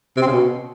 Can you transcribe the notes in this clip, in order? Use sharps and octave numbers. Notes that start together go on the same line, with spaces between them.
C3
C4
C#3
B2